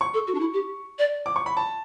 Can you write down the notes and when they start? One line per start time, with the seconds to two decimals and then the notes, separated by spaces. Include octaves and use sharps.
0.01 C#6
0.14 A4
0.27 F#4
0.35 D4
0.40 E4
0.53 G4
0.99 D5
1.26 D6
1.36 C#6
1.46 B5
1.57 A5